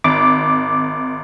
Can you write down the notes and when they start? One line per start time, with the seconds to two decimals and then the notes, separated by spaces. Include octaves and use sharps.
0.04 G#1 D6